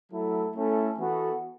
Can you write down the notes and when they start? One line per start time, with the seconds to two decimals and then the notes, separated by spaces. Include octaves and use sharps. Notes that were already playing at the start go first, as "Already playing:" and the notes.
0.12 F#3 A3 E4 A4
0.55 A3 C#4 E4 A4
0.98 E3 B3 F#4 A4